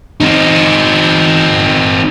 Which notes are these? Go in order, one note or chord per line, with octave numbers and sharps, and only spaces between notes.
C4 D#4